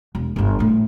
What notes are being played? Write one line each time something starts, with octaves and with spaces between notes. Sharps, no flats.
E1
G1 G2
A#1 A2